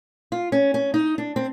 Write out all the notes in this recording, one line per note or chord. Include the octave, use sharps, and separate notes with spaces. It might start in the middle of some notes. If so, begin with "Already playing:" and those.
F4
C#4
C#4
D#4
D4
C4